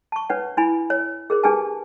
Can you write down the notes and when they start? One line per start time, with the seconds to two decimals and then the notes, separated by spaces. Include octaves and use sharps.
0.12 A5 C#6
0.30 D4 B4 C#5 F#5
0.57 D4 E4 G#5 B5
0.90 C#5
1.30 G#4 A#4 C5
1.43 D4 G4 G#4 B4 G#5 A5